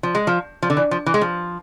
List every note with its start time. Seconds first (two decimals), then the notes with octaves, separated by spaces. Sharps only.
0.03 F3
0.15 G#3
0.27 F3
0.62 F3
0.70 D3
0.77 E3
0.91 F3
1.06 E3
1.14 G#3
1.21 F3